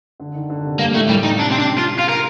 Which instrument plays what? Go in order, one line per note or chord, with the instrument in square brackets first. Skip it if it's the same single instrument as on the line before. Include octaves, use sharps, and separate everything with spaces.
[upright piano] D3
D#3
D3
C3
[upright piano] G2 [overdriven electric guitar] A#3
[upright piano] A2 [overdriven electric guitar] A3
[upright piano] A2 [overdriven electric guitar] G3
[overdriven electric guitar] D#4
[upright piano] C3 [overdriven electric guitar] D4
[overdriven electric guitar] C4
D4
F4
F4
A#4